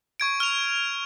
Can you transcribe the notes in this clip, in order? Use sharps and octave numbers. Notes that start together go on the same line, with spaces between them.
C#6 G#6 D7
F6 F7